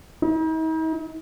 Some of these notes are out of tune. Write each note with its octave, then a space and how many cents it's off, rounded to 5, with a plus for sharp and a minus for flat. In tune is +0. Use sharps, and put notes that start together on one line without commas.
D#4 +45